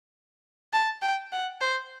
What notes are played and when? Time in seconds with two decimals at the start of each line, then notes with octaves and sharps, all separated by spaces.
0.73 A5
1.02 G5
1.33 F#5
1.61 C5